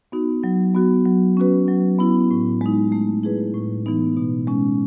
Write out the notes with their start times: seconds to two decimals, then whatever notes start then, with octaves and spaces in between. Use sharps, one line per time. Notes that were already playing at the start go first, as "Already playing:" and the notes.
0.12 B3 D#4 F#4
0.44 F#3
0.74 B3 F#4
1.05 F#3
1.37 C#4 F#4 B4
1.68 F#3
1.99 B3 E4
2.31 A2
2.61 G#3 D#4
2.92 A3
3.23 E4 G#4 B4
3.54 A2
3.86 E3 B3 D#4
4.17 B2
4.47 G#3 C#4